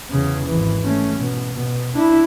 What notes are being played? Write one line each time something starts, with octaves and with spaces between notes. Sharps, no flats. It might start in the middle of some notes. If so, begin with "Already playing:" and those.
E2 C#3
G#1 E3
A3 C#4
B2
B2
D4 E4